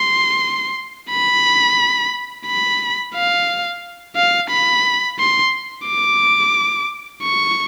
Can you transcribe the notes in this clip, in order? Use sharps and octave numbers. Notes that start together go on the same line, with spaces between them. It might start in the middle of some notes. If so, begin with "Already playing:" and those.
Already playing: C6
B5
B5
F5
F5
B5
C6
D6
C#6